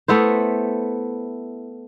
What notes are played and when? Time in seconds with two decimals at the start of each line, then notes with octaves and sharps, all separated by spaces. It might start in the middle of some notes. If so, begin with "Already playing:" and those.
0.08 A3 B3 E4 C5